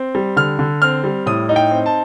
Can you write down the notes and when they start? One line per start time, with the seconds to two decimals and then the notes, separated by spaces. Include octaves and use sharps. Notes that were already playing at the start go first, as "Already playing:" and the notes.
Already playing: C4
0.15 G3
0.36 D3 F6
0.59 D3
0.82 C4 F6
1.04 G3
1.26 A2 D#6
1.49 D#4
1.56 G5
1.71 C4
1.86 A5